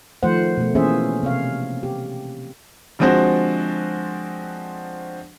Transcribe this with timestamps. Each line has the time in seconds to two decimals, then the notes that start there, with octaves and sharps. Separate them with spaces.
0.23 D#3 F3 A3 C5 F#5
0.57 B2 A3
0.75 E3 A#3 C#4 G#4 C5 E5
1.23 C3 C#5 F5
1.83 G4
2.99 D3 F3 G#3 C4 F#4 C5